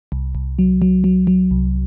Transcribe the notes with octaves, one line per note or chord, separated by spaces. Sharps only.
C2
C2
F#3
F#3
F#3
F#3
C2